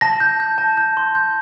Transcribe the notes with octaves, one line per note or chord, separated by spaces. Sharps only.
A5 A#6
G6
G6
A5
G6
C6
G6